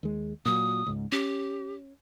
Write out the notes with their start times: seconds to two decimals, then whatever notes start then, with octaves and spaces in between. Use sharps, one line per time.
0.03 D#2 G#3
0.45 A#2 F#3 D#6
0.86 C#2 G#2
1.12 C#4 G4